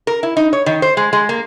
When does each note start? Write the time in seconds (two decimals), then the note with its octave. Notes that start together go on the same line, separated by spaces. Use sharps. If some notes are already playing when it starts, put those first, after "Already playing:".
0.07 A#4
0.23 E4
0.37 D#4
0.53 C#5
0.66 D#3
0.82 C5
0.97 G#3
1.13 G#3
1.29 A#3